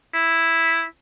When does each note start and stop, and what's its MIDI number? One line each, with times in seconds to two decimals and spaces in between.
0.14 0.84 64